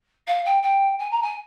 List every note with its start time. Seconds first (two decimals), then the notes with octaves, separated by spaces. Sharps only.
0.27 F5
0.45 G5
0.62 G5
0.99 G#5
1.11 A#5
1.22 G#5